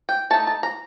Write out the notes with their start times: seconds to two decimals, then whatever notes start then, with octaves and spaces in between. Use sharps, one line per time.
0.09 G5
0.30 A3 D#4 A5
0.47 A5
0.63 A#5